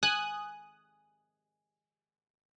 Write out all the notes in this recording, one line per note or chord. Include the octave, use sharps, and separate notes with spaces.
G#5 D#6 F#6